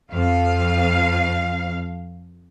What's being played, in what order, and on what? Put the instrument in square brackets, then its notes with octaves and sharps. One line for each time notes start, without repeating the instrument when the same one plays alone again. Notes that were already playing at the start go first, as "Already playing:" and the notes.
[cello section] F2 F5